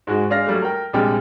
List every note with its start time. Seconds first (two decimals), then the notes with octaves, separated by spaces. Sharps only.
0.07 G#2 G#3 F#4
0.30 G#3 D4 F5 F6 A#6
0.46 F#3 G3 A3
0.62 A#4 G5
0.93 A#1 C3 G3 G#3 G5 F6